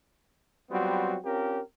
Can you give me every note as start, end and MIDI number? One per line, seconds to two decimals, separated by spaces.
0.71 1.16 54
0.71 1.16 55
0.71 1.16 59
0.71 1.16 60
0.71 1.16 65
0.71 1.16 66
1.24 1.60 60
1.24 1.60 61
1.24 1.60 65
1.24 1.60 67
1.24 1.60 70